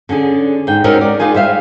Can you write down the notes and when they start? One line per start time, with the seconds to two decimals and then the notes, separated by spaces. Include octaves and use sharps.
0.09 D3 C#4 D4 G#4
0.67 G#2 G5
0.84 G#3 C4 C#4 D#4 F#4 A#4
1.01 D5
1.19 G#3 D#4 F4 G#4 G#5
1.34 G3 C5 E5 F5